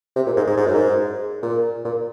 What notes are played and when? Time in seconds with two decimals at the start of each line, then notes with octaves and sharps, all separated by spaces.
0.16 C3
0.26 A#2
0.37 G#2
0.47 G#2
0.58 G#2
0.66 F#2
0.74 G#2
1.43 A#2
1.85 A#2